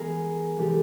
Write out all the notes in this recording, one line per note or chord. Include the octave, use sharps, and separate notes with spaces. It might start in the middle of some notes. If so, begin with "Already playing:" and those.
Already playing: E3 G#3 B3 G#4 A#4
C3 E3 G#3 G4 A4